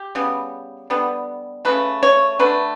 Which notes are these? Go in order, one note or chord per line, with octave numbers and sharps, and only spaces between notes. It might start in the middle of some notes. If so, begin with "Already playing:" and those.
Already playing: G4
C#3 G3 B3
D3 G3 B3
C#3 F#3 A3 B4
C#5
D3 A3 B4